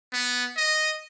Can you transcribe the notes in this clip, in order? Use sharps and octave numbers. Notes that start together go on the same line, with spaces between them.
B3
D#5